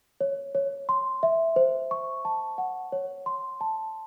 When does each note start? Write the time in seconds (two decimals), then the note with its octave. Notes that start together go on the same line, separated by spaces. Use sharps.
0.21 C#5
0.55 C#5
0.89 C6
1.23 E5
1.56 C5
1.91 C#6
2.25 A5
2.58 F#5
2.92 C#5
3.26 C6
3.61 A5